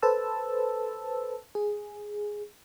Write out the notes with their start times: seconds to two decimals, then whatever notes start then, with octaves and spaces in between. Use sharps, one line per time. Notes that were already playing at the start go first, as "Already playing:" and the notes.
0.02 A4 B4 C5 A5 E6
1.55 G#4